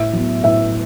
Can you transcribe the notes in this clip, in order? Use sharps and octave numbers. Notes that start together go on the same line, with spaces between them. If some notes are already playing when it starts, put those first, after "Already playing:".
Already playing: A2 E5
F#3 B3
A2 E5